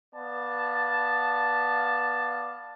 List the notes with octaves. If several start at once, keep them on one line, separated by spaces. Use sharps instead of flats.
B3 D5 F5 A5